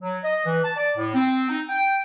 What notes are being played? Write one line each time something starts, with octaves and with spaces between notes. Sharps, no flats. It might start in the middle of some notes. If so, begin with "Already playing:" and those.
F#3
D#5
E3
A5
D5
A2
C4
D#4
G5